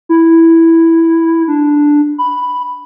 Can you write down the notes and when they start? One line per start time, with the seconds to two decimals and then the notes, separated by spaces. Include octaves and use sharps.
0.09 E4
1.48 D4
2.18 B5